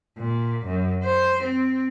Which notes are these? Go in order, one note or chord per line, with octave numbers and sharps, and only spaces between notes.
A#2
F#2
C5
C4